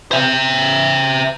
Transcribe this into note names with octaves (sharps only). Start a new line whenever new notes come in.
C5 E5